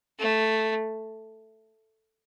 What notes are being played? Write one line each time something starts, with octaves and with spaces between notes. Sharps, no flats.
A3